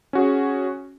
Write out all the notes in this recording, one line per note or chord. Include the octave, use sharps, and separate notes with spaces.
C#4 F#4 G#4